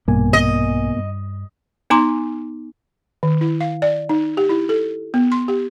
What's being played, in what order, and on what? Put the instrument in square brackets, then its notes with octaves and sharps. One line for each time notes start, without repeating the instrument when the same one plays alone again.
[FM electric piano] A#1 G2 G#5 [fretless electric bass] B2 A#3
[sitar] D#5
[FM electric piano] G2
[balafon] B3 D#4 G#5 A#5 C6 D6
D#3
E4
F5
D5
D#4
G4
E4
A4
B3
C6
G4